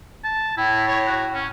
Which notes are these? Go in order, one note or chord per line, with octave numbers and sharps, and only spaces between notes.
A5
A2 E4
C#5
F#4
C#4